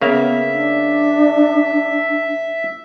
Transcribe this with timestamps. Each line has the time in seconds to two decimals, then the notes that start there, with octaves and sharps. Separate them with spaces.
0.01 C#3 A#3 B3 E5 F5
0.53 D4